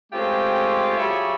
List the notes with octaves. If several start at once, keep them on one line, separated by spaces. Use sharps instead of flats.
G#3 A3 C4 C#4 F4 G4
F#3 G3 F4 G#4 C#5 E5